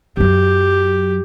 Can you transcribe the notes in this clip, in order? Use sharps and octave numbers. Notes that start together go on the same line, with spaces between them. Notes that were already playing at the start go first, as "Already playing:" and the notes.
F#2 F#3 G4